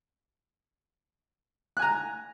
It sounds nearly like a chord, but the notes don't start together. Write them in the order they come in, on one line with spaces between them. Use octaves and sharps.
F#6 G#5 A#5